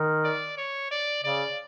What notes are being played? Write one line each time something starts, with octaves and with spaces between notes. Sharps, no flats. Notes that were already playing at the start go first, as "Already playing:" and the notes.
Already playing: D#3
D5
C#5
D5
C#3 D5